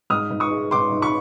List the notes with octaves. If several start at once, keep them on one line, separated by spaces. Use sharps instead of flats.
G#2 D#6 F6
G#2
C#6 D#6
G#3
G#2 C6 D6
G#2
B5 C#6